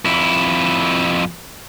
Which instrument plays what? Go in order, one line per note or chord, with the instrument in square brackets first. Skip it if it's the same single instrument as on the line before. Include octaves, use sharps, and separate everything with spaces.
[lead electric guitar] F2 E4